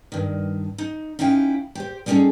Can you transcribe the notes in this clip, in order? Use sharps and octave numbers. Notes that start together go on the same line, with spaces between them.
G2 D#3
D#4
C#4 D#4 E4 F5 G5
G4 C5
G3 B3 C#4 D#4 G#4 A4